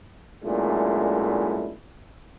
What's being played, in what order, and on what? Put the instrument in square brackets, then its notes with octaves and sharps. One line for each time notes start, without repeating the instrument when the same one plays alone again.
[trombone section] F#2 A#2 G#3 A3 D4 E4